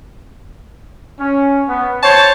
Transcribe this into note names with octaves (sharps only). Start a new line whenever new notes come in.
C#4
B3
C5 C#5 A5